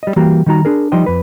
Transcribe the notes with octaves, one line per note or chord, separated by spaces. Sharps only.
G3 D#5
E3 G3 A#3 F#4 G4 A#5
D#3 G3 D#4 F#4 A#5
D4 G#4 A#4
F3 G3 D#4 C5 D#5 G5
F2 B4